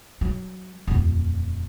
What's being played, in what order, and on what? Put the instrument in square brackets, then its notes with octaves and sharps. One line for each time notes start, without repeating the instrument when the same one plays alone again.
[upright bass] F#3
D#1 F2